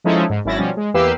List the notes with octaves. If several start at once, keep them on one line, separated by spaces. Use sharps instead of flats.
F3 G#3 C#4 D#4 E4 A4
G#2
G#1 F#2 E4 A6 A#6
B2 F3 G3 C#4
G#3
E2 A#3 G4 B4 E6 C7